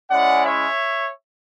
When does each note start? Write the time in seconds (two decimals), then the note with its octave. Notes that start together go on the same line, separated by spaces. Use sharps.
0.11 G#3 C#4 E4 D5 F#5
0.46 C#5 E5